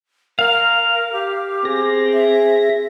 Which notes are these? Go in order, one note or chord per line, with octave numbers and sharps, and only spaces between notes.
A#4 F5
G4
C4 G#4 A#6
E5